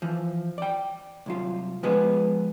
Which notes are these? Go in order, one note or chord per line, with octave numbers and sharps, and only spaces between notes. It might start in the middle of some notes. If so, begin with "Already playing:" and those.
E3 F3
D5 G5
C2 F#3 F4
F3 G#3 B3 G#4 B4